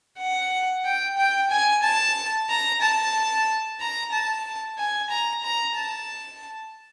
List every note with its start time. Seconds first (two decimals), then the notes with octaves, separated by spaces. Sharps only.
0.19 F#5
0.85 G5
1.17 G5
1.50 G#5
1.83 A5
2.49 A#5
2.81 A5
3.80 A#5
4.12 A5
4.79 G#5
5.10 A#5
5.43 A#5
5.76 A5